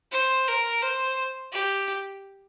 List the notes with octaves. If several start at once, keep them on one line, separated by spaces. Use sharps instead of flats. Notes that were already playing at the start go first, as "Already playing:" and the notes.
C5
A#4
C5
G4